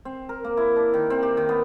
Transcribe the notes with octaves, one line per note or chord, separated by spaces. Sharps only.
C4
A#4
A#3
E4
D4
D#3
C4
G4
D#3
B3